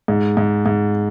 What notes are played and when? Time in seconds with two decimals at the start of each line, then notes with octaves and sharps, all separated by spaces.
0.08 G#2
0.37 G#2
0.66 G#2